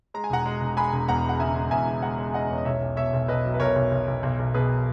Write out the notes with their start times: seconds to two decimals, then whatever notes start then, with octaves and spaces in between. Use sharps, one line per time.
0.14 G#3 A#5
0.24 G#5
0.30 E1 F#5 A#5
0.45 G#3
0.61 E1
0.77 G#3 G#5 B5
0.92 E1
1.08 E2 F#5 A#5
1.24 G#3
1.29 F#5
1.40 C#3 E5 G#5
1.55 G#3
1.71 E2 E5 G#5
1.87 C#3
2.02 G#3 F#5 A#5
2.19 G#3
2.34 G#3 D#5 F#5
2.50 E2 C#5
2.58 D#5
2.65 B1 C#5 E5
2.82 B1
2.97 B2 C#5 E5
3.13 B1
3.28 B1 B4 D#5
3.44 F#3
3.54 B4
3.60 B1 A#4 C#5
3.76 B1
3.92 B1
4.07 B1
4.23 B1
4.39 B1
4.54 B2 G#4 B4